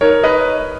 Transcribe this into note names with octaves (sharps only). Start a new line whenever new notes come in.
D#4 A#4 C#5
B4 D#5